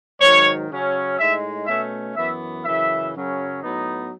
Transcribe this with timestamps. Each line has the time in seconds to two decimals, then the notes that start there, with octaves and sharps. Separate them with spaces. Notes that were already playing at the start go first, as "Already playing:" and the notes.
0.21 G#2 D#3 F#3 C#5
0.70 C#3 F#3 C#4
1.19 A2 G#3 D#4 E5
1.67 B2 A3 C#4 E5
2.16 F#2 E3 B3 E5
2.65 F#2 C#3 E3 E5
3.14 F#2 C#3 F#3 C#4
3.63 A2 F#3 B3 D#4